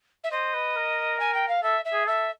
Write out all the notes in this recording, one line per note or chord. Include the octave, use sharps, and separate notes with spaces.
E5
C5 D#5
B4
A#4
G#5
G5
F5
A4 E5
E5
G#4
A4 E5